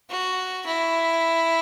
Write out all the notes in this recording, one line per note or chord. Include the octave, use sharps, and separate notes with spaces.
F#4
E4